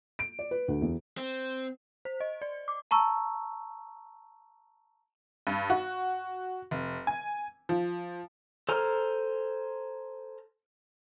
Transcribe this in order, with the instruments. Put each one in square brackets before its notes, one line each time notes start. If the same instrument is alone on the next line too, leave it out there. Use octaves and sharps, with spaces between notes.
[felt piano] D7
D5
B4
D2
E2
[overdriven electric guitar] C4
[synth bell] C5
D#5
D5
D6
[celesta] A5 A#5 C#6 E6
[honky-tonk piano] G2
F#4
F1
G#5
F3
[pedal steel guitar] A4 C5 G#5 A#5 F6